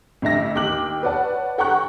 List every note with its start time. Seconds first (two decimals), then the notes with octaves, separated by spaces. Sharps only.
0.22 A1 D3 E5 A#6
0.55 D#2 G5 D6 F#6 F#7
1.03 B4 C#5 D5 F#5 A5
1.58 A4 F#5 G5 A#5 C#6 F#6